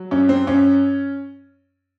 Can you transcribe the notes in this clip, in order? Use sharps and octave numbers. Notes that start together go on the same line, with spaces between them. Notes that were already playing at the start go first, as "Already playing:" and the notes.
Already playing: F#3
F#2 C#4
C4
F#2 C#4